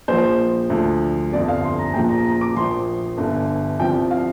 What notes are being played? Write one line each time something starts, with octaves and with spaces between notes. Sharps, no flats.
A#1 A#2 F3 C5
D2 D3 F3
G1 F2 D3 F3 D5
F5
C6
A#5
A#1 A#2 F3 G5
A#5
A#5
D6
A#1 A#2 F3 C6
G1 G2 D3
C2 C3 F3 G5
F5